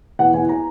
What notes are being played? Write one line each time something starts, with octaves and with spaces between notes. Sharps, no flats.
E2 F#5
E2 G#5
A#5